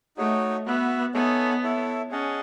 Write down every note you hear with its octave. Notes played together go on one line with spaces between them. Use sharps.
A3 D#4 F#4 C#5
B3 F#4 B4 E5
B3 D#4 A4 C#5 E5 G#5
E4 A4 C#5 E5
C#4 G#4 D#5 F#5 A5